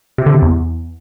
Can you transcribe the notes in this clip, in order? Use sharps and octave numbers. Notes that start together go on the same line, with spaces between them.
C3
D3
C3
E2